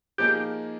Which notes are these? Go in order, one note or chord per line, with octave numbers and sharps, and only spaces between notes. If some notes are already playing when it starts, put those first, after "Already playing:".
F3 A#3 D#4 G4 G#4